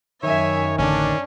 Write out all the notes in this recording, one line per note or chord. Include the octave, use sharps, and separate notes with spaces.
F#2 D#3 C#5 E5 G#5
A1 D3 C#4 D4